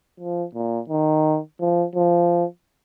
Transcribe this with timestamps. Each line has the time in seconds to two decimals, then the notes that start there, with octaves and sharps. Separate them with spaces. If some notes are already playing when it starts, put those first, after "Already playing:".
0.20 F3
0.55 A#2
0.90 D#3
1.61 F3
1.95 F3